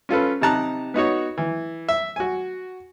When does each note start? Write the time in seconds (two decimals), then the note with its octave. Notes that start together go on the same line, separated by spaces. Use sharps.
0.09 C#4 F4 A4 B4
0.41 C3 D#4 G4 A5 A#5 F#6
0.94 B3 D#4 F#4 C#5
1.38 E3
1.89 E5
2.16 F#4 G#5